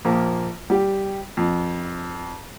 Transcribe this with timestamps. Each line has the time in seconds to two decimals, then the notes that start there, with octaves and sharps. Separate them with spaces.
0.05 A#1 F3 A#3
0.70 G3 G4
1.37 F2